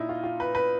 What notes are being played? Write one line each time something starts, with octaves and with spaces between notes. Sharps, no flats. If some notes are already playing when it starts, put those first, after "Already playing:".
Already playing: A#2 D#4 E4
F4
F4
B4
B4